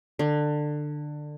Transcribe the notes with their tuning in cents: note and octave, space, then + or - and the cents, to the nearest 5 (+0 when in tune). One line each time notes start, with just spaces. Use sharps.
D3 +20